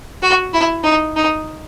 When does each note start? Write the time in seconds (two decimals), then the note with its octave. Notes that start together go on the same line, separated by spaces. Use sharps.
0.22 F#4
0.53 E4
0.84 D#4
1.16 D#4